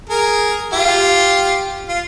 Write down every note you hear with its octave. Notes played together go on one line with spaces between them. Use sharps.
G#4 A#4
F4 G4
F4